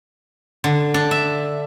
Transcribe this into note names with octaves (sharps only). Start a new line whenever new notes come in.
D3
D4
E5